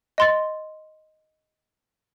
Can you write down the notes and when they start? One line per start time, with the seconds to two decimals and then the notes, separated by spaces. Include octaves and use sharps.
0.18 D#5 C6 A6